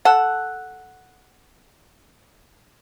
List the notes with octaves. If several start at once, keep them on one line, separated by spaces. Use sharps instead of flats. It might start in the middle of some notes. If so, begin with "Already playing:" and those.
A4 F#5